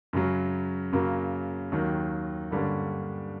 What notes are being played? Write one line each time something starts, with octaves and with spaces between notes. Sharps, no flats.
F#2 C#3 F#3
F#2 C#3 F#3 A#3
D#2 D#3 F#3
G2 D3 G3 A#3 C#4